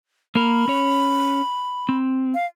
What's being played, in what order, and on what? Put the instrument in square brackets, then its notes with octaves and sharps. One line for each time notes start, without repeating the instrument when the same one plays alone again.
[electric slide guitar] A#3 A#4 [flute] B5
[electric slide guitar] C#4 C#5
C4
[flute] F5